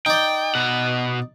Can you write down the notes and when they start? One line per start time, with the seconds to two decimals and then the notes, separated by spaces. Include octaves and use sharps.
0.06 D#4 D5 G5
0.55 B2 F#5